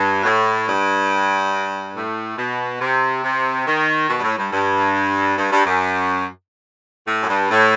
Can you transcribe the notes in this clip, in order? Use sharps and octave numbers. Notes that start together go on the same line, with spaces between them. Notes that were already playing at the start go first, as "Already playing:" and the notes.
Already playing: G2
B2
A2
G2
A2
B2
C3
C3
D#3
B2
G2
A2
G2
G2
G2
G2
F#2
A2
F#2
G2
A2